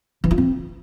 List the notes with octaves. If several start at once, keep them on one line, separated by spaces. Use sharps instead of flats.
E3
F4
C4